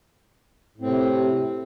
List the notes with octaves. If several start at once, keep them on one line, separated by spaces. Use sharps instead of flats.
A2 C3 C4